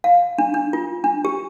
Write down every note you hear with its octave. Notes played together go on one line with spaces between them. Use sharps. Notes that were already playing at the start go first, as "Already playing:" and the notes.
F5
D4
D4
F4
D4
G4